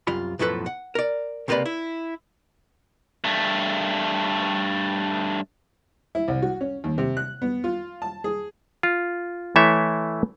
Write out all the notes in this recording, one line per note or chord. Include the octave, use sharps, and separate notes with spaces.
C2 F#2 F4 B5
B1 F#2 A2 F3 A4 B4
F#5
A#4 D5
C#2 C3 A#3 B4 D5 B5
E4
G2 A3
E4
C2
F#4
C#4
D#2
C3
F#6
B3
F4
A5
G#4
F4
E3 A3 E4 C#5 E5